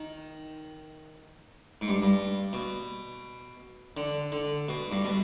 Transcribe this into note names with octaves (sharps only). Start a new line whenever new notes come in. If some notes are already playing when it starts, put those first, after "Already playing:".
Already playing: D#3
G#2
G2
G2
B2
D3
D3
B2
G2
B2